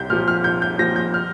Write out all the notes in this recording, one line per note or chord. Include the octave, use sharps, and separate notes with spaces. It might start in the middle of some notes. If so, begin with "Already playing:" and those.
Already playing: C2 G6
A#2 F3 F6
F6
C2 G6
G6
A#2 F3 A#6
G6
F6